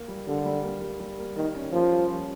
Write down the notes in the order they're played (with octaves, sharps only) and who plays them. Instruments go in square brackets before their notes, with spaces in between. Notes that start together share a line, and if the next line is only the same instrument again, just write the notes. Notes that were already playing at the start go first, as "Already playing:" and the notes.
Already playing: [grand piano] A#3
G3
[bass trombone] D3 [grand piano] G3
[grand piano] G3
A#3
G3
G3
A#3
[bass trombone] D#3 [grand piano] A#3
[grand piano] C#4
[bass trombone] F3 [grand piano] A#3
[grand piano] G3
C#4